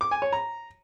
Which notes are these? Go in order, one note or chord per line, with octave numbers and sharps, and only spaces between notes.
D6
G#5
C#5
A#5